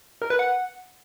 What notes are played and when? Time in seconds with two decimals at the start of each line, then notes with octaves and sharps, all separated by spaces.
0.22 A#4
0.30 B4
0.39 F#5